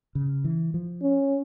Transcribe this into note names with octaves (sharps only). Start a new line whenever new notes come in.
C#3
E3
F3
C#4